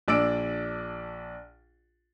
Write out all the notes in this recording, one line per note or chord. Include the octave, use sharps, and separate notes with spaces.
A#1 D4 D5 E6 D7